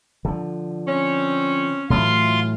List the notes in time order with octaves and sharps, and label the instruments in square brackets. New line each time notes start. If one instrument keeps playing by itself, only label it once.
[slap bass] D3 F3
[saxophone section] C4 C#4
[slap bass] A2 E3 F#3 [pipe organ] F4 C6